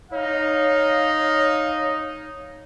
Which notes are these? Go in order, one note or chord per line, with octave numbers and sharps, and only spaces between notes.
D#4 C#5 F5